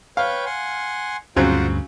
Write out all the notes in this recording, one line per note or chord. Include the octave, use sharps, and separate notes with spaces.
B4 C#5 F5 G5
F#5 G#5 C6
D2 G2 C#3 F#3 C4 F4 C5 F#5